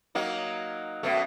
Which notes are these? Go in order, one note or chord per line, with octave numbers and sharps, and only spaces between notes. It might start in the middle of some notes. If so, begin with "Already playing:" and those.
F#3 A#3 D#4
F#2 B2 A3